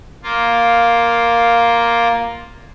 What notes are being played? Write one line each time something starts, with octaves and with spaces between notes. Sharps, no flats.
A#3 F4